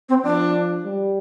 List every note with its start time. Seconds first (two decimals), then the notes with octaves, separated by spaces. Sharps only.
0.09 C4
0.23 F3 D4
0.84 G3